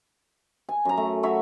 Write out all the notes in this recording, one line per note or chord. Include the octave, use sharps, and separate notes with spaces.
G#5
F#2 A#5
A3
F#3 C#5 E5 B5